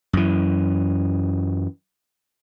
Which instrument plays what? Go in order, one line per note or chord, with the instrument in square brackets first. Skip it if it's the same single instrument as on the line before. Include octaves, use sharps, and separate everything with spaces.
[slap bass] F#2 E3